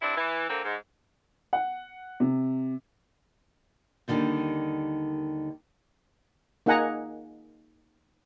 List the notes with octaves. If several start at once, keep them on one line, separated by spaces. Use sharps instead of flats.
G2 C4 D4 E4
E3
D3 A#3 C4
G#2
F#5
C3
D#2 D3 D#3 G3
A#3 D#4 G#4 F#5 G#5 A#5